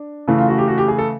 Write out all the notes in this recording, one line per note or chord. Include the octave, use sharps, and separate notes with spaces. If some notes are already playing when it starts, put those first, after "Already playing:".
Already playing: D4
C#3 E3 A3
F4
F#4
G4
F#4
G4
G#4
A4